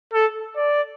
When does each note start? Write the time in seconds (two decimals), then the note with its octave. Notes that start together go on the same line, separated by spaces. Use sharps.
0.13 A4
0.56 D5